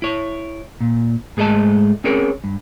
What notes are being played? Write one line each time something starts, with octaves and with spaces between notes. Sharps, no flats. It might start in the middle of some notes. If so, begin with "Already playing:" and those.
E4 C#5
A#2
G#2 G#3 A3 E4 D#5 A5
C4 C#4 G#4 A#4 C#5
G2